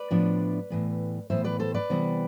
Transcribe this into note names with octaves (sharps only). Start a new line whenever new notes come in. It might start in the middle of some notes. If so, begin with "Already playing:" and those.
Already playing: B4 D5
A2 F3 B3 D4
A2 E3 B3
A2 E3 B3 C5 E5
B4 D5
A4 C5
B4 D5
C3 E3 G3 B3